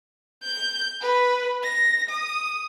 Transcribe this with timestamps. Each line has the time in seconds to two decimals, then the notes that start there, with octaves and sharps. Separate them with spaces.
0.43 G6
1.01 B4
1.63 A#6
2.10 D#6